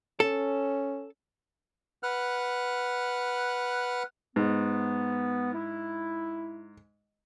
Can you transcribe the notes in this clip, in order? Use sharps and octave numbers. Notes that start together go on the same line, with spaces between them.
C#4 A4
B4 F#5 F6 F#6
G#2 B3
E4